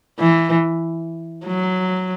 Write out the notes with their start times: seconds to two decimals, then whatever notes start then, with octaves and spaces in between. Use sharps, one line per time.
0.19 E3
1.46 F#3